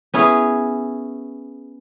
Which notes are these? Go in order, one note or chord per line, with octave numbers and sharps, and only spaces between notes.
B3 C#4 E4 G#4